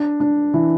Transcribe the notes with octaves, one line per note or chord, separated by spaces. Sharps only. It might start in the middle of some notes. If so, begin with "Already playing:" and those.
Already playing: D4
D4
E3